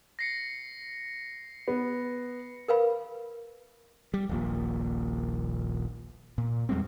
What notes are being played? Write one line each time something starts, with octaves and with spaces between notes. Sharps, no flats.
A#6 C7 C#7
B3
A#4 B4 F5 B5
G3
D#1 A#1 A#2
A#2
E2 G3 G#3 C4